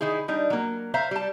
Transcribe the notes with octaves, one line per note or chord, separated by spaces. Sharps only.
D#3 D#4 E4 G#4
G3 D4 D#4
F#3 A#3
C5 E5 F5 A#5
G3 A5